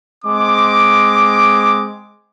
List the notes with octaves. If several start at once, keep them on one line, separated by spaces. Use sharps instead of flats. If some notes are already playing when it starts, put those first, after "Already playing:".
G#3 C4 D6